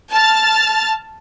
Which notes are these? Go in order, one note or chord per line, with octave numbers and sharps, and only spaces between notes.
A5 F6 A6